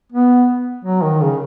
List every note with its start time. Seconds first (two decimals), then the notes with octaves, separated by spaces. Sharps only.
0.12 B3
0.84 F#3
1.03 D#3
1.21 C#3